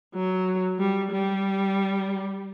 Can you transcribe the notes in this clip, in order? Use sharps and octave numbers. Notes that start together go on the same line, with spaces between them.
F#3
G3
G3